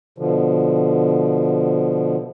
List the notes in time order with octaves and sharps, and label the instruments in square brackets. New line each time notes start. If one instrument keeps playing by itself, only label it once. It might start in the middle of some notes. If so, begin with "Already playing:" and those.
[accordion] B2 D3 F3